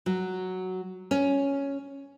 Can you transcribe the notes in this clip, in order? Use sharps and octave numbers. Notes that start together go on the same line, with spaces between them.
F#3
C#4